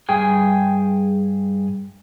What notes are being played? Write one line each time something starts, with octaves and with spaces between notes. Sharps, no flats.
G2 G#4 G5 G#5